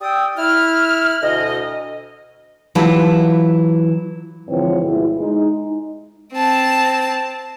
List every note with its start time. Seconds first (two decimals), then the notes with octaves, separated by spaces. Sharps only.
0.01 G4 D5 G5 D#6 E6
0.37 E4 F6
1.22 D2 B2 D#5
2.75 E3 F#3 E4 F4 G4 A5
4.49 G#2 D3 E3 F3 C4 C#5
4.82 D2 B2 G#3 E4
5.17 G#3 D#4
6.33 C4 A5